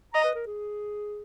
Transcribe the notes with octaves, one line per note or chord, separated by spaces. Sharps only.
D#5 A#5
B4
A#4
G#4